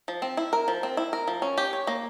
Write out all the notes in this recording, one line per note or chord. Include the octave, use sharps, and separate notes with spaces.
F3
C4
E4
A#4
F3
C4
E4
A#4
F3
C#4
G4
C#5
A#3